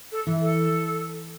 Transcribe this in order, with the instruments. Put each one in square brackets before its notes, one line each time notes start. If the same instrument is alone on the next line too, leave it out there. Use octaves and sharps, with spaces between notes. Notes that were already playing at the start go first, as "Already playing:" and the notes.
[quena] A4
[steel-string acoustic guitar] E3
[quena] A4